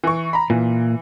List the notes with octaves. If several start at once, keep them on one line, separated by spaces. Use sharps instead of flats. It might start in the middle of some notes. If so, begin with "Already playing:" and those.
E3 C#6
A#5 B5
A#2 E3